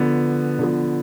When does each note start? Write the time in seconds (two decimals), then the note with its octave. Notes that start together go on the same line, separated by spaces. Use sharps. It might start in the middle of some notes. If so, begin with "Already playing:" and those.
Already playing: D3 F3 B3
0.59 D3 F3 B3